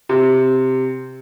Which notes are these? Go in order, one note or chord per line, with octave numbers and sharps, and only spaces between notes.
C3